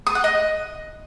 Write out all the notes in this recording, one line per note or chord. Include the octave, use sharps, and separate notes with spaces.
D#6
F#5
D#5